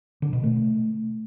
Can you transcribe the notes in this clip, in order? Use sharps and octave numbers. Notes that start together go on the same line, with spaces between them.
D3
B2
A3